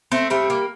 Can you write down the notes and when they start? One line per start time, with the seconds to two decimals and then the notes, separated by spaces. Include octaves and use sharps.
0.12 A3 C4
0.30 G3 A3 C4
0.50 A#3